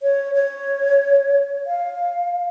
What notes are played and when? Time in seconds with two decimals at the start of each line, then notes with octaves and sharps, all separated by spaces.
0.02 C#5
0.35 C#5
1.67 F5